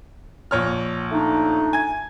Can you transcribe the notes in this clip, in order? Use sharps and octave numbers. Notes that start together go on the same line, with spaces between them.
A#1 C#5 F6
A3 D4 D#4
G#5 G#6